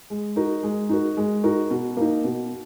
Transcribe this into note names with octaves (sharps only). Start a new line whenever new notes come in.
G#3
D#4 F#4 A#4
G#3
D#4 F#4 A#4
G#3
D#4 F#4 A#4
B2
A#3 D#4
B2